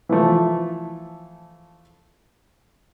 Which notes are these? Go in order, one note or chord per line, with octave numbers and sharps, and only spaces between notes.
E3 F3 A3